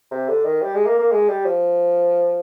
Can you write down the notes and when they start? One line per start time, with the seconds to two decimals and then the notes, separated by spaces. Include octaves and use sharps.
0.11 C3
0.28 D3
0.45 D#3
0.62 G3
0.74 G#3
0.86 A#3
0.99 A#3
1.12 G#3
1.28 G3
1.45 F3